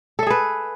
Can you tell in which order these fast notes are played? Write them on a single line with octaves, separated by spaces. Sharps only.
A4 E5 G#4 B4